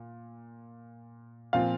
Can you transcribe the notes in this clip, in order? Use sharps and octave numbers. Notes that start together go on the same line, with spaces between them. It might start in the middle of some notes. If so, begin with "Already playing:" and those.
Already playing: A#2
A#2 F3 C4 F4 F5